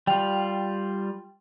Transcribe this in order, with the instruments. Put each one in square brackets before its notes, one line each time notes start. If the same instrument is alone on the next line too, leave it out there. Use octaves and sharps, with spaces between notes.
[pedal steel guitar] G3 F4 [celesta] G5 F7